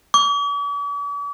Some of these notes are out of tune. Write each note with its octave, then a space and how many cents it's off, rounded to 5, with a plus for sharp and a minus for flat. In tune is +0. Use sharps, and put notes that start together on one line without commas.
D6 -45